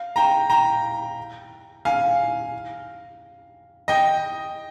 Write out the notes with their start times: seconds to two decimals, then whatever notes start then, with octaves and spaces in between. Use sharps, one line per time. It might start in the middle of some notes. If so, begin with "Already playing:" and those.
Already playing: F5
0.16 G5 A#5
0.50 G5 A#5
1.85 F5 G#5
3.88 D#5 G5